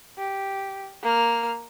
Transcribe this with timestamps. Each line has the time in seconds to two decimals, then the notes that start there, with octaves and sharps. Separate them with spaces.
0.18 G4
1.03 A#3 F6